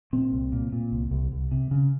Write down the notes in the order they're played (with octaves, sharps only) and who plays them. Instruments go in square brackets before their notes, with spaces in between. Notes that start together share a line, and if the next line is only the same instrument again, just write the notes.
[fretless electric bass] A#2 C4
C2
A#2
A#2
C2
C2
C2
C3
C#3